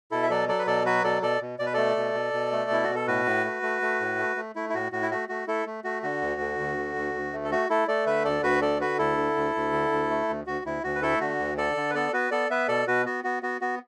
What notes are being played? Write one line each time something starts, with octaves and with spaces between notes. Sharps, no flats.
B2 E4 A4
E5
F#3 A4 D5
F#3 A4 D5
B4
B2 A4 D5
F#3 F#4 B4
B2 A4 D5
B2 A4 D5
B2
B2 D5
B4
A3 A4 D5
B2
B2
B2
A3
B2 E4
B2 F#4
A4
A2 F#4 B4
A2
A3
A3
A3
A2
A3
A3
A3 E4
E4
A2 F#4
A2 F#4
E4
A3 F#4
A3 F#4
A3 E4 A4
A3
A3 F#4
D3 F#4
D2
D3
D2
D3
D2
D2
A3
A4
A3 F#4
A3 E4 A4
A3 A4 D5
D3 B4 E5
D2 A4 D5
D2 F#4 B4
D3 A4 D5
D3 F#4 B4
D2 E4 A4
D3
D2
D2
D3
D2
A3
D2
D2 F#4
D2 E4
D2 F#4
B4
A3 E4 A4
D3 F#4
D2
D3 A4 D5
D3
B4
B3 A4 D5
B3 F#4 B4
B3 A4 D5
B3 B4 E5
B2 A4 D5
B2 F#4 B4
B3 F#4
B3 F#4
B3 F#4
B3 F#4